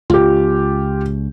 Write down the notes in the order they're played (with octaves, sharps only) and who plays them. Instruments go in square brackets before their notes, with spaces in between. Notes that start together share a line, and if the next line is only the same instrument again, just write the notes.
[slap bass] C#2 [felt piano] F4 G4